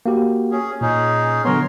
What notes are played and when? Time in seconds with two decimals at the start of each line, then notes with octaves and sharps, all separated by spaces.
0.06 A#3 F#4 G4
0.52 C#4 G#4
0.81 A#2 C#4 D#4 G#4
1.45 D3 F#3 B3 A#4 C#5 C6